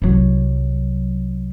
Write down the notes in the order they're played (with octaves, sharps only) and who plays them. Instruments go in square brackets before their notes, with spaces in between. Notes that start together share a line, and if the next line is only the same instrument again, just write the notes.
[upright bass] C2 F#3